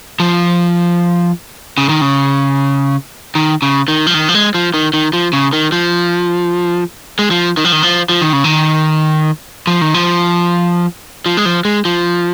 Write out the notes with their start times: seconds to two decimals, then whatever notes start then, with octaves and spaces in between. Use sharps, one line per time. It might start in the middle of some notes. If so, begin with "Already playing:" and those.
0.20 F3
1.78 C#3
1.89 D#3
2.01 C#3
3.35 D#3
3.62 C#3
3.88 D#3
4.07 F3
4.14 D#3
4.29 F3
4.34 G#3
4.55 F3
4.74 D#3
4.94 D#3
5.13 F3
5.33 C#3
5.53 D#3
5.72 F3
7.19 G#3
7.31 F3
7.57 D#3
7.65 F3
7.72 D#3
7.83 F3
8.09 F3
8.21 D#3
8.33 C#3
8.44 D#3
9.67 F3
9.81 D#3
9.94 F3
11.26 F3
11.37 G#3
11.45 F3
11.65 G#3
11.85 F3